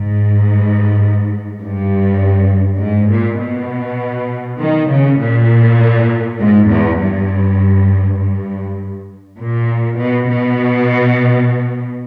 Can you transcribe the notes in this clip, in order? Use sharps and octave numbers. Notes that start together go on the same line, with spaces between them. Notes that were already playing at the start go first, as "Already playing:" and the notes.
Already playing: G#2
G2
G#2
A#2
B2
D#3
C#3
A#2
G#2
E2
G2
G2
A#2
B2
B2